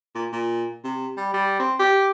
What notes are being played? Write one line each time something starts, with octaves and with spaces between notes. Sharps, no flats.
A#2
A#2
C3
G3
G3
C4
G4